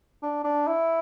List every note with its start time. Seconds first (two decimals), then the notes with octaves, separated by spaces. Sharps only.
0.23 D4
0.44 D4
0.67 E4